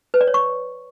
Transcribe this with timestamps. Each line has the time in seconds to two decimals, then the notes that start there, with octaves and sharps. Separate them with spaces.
0.14 B4
0.21 D5
0.27 C#5
0.34 C#6